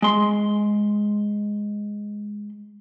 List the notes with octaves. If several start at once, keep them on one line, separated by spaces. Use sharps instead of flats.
G#3 C6